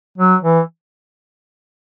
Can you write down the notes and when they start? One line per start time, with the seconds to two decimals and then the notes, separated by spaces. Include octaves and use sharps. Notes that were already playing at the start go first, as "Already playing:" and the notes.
0.18 F#3
0.43 E3